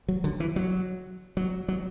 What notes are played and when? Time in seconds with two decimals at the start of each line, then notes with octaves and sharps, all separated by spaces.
0.08 F#3
0.24 D3
0.40 E3
0.56 F#3
1.37 F#3
1.68 F#3